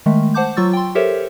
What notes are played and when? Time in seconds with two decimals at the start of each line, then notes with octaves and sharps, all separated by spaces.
0.06 D#3 G#3 A3
0.34 C5 F#5 A5 D6 G6
0.57 F#3 F4 C#6 E6 A6
0.73 G5 C6
0.95 G4 A4 A#4 C5 C#5 E5